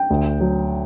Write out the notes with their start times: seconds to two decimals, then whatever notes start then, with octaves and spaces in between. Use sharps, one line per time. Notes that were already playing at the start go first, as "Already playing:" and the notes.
Already playing: G5
0.10 D2
0.41 F#3